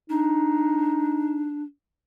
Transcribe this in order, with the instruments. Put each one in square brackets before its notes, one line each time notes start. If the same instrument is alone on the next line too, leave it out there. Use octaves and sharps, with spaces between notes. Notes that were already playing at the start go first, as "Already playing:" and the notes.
[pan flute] D4 [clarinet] D#4